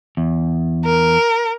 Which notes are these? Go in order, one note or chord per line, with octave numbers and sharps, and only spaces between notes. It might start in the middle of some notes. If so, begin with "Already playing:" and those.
E2
A#4